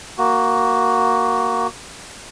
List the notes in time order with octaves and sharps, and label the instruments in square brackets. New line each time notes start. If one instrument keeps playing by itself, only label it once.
[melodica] A#3 F#4